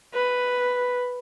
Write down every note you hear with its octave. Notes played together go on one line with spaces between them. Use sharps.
B4